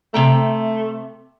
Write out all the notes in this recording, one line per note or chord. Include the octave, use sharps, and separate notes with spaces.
C3 A3 G5 A#5